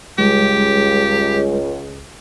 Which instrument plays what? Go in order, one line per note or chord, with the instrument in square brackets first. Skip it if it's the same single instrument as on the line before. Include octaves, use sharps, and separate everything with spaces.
[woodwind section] C#2 [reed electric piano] G3 G#3 [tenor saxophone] G4